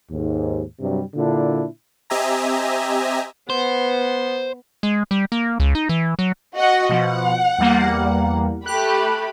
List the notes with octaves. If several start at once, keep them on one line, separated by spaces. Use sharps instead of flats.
D#2 G#2
G2 C3 F#3 G3
A#2 D3 D4 E4
C4 G4 D#5 E5 G#5 A#5
B3 C5
G#3
G3
A#3
C#2
D#4
E3
F#3
F#4 D#5 F#5
B2 F3 F#5
E2 G3 A#3
A3 G4 B5 F#6